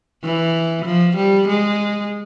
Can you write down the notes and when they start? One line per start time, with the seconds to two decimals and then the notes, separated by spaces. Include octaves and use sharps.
0.23 E3
0.86 F3
1.17 G3
1.48 G#3